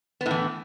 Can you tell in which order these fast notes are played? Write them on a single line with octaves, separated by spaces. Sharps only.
B3 A2 E3